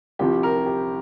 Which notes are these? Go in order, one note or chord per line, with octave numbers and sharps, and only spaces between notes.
C2 C3 F3 G4
A#4
G4